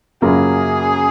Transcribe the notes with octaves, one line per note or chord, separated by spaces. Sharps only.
F#2 C#3 F#3 A#3 F4 G#4